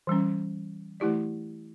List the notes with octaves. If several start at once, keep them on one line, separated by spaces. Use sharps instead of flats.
E3 G3 C#4
E3 A3 E4 G4 D5